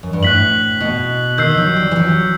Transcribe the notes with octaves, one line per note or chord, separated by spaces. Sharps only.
F#2
G2
A2 F#6 B6 F#7
B2
D#3 E6 G6 C7
F#3
G3
E3
F#3